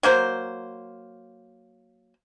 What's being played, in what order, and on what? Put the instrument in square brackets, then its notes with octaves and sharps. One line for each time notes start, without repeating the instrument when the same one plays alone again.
[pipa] F#3 A#3 C5